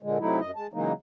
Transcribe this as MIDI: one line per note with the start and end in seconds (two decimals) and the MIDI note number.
0.03 0.18 46
0.03 0.18 50
0.03 0.18 56
0.19 0.40 48
0.19 0.40 54
0.19 0.40 57
0.19 0.40 63
0.19 0.40 64
0.40 0.51 42
0.40 0.51 75
0.56 0.67 56
0.56 0.67 81
0.73 0.93 49
0.73 0.93 52
0.73 0.93 54
0.73 0.93 56
0.73 0.93 58
0.73 0.93 63